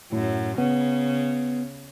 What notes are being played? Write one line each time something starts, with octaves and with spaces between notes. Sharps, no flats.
F#2 A2
C#3 B3